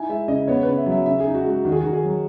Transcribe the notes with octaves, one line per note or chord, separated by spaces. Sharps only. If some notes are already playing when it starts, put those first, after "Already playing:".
Already playing: D#4 E4 G#5
G#3 E5
C#3 D#5
B3 C#5
B4
C#3
E5
F#3
E5
C#3 E5
G#4
D#4
F#4
G#3
F#4
D#3 F#4
G#4
D#3 F#4
G#4
F#3